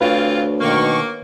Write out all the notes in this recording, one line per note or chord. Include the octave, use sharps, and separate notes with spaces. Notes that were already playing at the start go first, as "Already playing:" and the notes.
D2 E3 C4 F4 B4 C#5 F5
B2 D#3 A#3 C#6